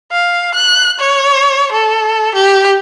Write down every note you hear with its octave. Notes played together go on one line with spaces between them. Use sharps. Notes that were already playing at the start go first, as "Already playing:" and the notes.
F5
F#6
C#5
A4
G4